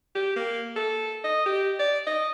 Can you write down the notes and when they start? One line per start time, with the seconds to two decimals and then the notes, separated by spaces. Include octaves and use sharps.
0.15 G4
0.36 A#3
0.76 A4
1.24 D#5
1.46 G4
1.79 D5
2.07 D#5